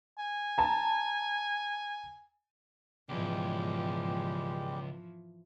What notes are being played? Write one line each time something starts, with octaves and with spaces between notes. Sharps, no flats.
G#5
A5 A#5
C#2 G#2 B2 E3 F3 G3 G#3 G4